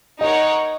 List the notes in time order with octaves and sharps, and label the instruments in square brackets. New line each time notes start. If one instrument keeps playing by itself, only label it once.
[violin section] D#4 A#4 C#5 F#5 [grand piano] D#5